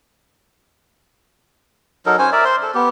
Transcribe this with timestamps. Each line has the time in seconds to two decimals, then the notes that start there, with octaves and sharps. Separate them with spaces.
2.06 F#3 D#4 A4 A#4
2.19 C#4 C5 C#5 G#5
2.32 A#4 D5 E5
2.45 C5 C6
2.63 A4
2.75 B3 G4